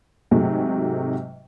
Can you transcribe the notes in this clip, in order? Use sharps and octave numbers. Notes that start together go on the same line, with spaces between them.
G#2 C3 F#3 G#3 A3